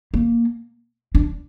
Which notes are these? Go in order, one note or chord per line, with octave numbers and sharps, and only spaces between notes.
A#3
D4